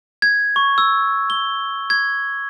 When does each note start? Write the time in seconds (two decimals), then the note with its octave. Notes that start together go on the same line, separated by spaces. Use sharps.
0.22 G#6
0.56 C#6
0.78 E6
1.30 G7
1.90 G#6